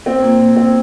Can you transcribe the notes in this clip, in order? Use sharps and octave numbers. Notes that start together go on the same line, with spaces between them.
C4
A#2
A#2
C4